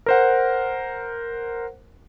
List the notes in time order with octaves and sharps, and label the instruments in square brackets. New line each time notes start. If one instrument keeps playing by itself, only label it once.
[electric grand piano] A#4 C5 F#5